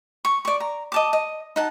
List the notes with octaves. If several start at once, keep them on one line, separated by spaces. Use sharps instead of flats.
C#6
D5 C#6
A#5
D#5 A5 D6
D#5
D#4 F#5 A5